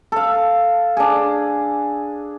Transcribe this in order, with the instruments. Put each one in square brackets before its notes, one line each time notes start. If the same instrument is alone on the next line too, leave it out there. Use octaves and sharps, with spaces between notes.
[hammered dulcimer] A4 F5
D4 G#4